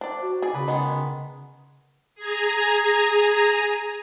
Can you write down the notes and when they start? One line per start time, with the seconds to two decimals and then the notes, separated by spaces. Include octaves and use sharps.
0.01 D4 C5 D5
0.22 F#4
0.42 G#4 D5
0.54 C#3 B4
0.68 D#3 G#3 B3
2.15 G#4 G#5 A#5